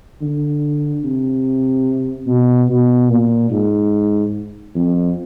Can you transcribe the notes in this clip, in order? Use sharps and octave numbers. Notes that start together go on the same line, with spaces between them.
D3
C3
B2
B2
A#2
G#2
F2